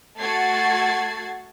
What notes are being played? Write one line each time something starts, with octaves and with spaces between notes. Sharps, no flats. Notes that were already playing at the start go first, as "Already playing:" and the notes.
A3 F#4 G#6 A6 C7